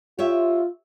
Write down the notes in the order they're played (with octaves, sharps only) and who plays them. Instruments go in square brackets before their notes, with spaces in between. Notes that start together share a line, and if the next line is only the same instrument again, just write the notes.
[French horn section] F4 [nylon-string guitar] G4 C#5 E5